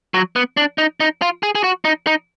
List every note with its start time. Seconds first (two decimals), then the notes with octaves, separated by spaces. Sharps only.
0.14 F#3
0.36 B3
0.57 D4
0.78 D#4
1.00 D#4
1.22 F4
1.43 G#4
1.55 G#4
1.64 F#4
1.85 D#4
2.07 D#4